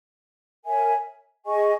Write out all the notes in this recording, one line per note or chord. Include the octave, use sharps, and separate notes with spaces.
A#4 C#5 E5 G#5
G#4 D#5 G#5 C#6